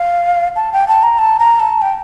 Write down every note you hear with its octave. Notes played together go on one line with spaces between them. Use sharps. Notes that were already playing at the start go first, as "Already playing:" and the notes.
Already playing: F5
A5
G5
A5
A#5
A5
A#5
A5
G5